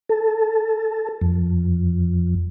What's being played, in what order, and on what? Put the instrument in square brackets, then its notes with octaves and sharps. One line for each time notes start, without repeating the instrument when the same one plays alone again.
[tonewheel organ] A4
F2